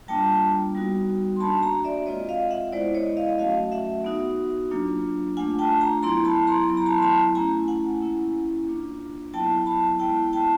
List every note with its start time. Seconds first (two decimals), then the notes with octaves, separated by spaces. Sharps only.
0.08 G3 A#3 D4 F4 G5 A5
0.75 G3 B3 D#4 F#4
1.36 C6
1.40 A#3 D4 F#4 A5 B5
1.63 G#5 A#5
1.84 D5 E5
2.06 G#3 C4 F4 C#5 D#5
2.29 D#5 F5
2.51 E5 F#5
2.72 G#3 B3 E4 C5 D5
2.94 C#5 D#5
3.17 D#5 F5
3.38 F#3 A3 C#4 F#4 D#5 F5
3.72 E5 F#5
4.05 B3 D#4 F#4
4.71 F#3 A#3 D4 F4
5.37 A3 D4 F4 F#5 G#5
5.59 G5 A5
5.81 G#5 A#5
6.03 F#3 B3 E4 A#5 C6
6.25 A5 B5
6.47 A#5 C6
6.69 F#3 B3 E4 B5
6.77 A#5
6.86 A5 B5
6.97 C6
7.02 A5 B5
7.35 A3 C#4 E4 G#5 A#5
7.68 F#5 G#5
8.01 A#3 C#4 E4
8.67 A#3 D4 F4
9.33 F#3 B3 E4 G5 A5
9.66 A5 B5
9.99 G#3 B3 E4 G5 A5
10.33 G5 A5